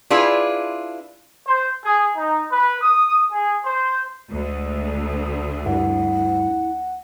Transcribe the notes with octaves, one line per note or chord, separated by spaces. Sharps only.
D4 E4 F4 G#4 B4
C5
G#4
D#4
B4
D#6
G#4
C5
D2 G#3
G2 E4 F#5